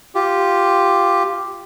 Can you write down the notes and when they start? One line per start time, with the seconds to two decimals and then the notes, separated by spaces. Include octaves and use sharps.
0.15 F4 G4